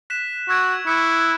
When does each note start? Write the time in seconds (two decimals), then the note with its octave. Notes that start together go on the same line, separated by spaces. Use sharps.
0.10 F#6 B6 E7
0.49 F#4 C#6 E6 G#6 D7
0.87 E4 D6 F#6 C#7